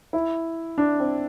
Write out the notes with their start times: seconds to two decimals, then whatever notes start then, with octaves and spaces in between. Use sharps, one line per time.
0.13 E4
0.78 D4
1.00 C4